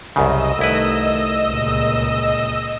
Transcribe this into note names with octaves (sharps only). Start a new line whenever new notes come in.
C2 F#2 C#3 D#5 E6
C2 D#3 A3 E4 B4
C#2 A#2